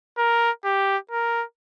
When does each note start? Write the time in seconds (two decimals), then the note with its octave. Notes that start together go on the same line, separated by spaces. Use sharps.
0.18 A#4
0.65 G4
1.11 A#4